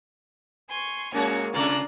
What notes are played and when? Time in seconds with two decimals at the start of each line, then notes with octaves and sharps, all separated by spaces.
0.68 G#5 C6 C#6
1.12 A#2 G#3 A#3 C#4 F#4 C#5
1.54 C3 A3 D4 F4 A#5 F#6